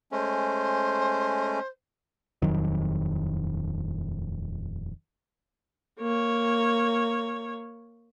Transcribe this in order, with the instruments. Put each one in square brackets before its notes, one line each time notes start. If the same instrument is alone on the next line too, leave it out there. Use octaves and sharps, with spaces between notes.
[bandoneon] G#3 A3 C#4 [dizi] C5
[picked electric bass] D#1 F2 D#3 F#3
[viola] A#3 C#5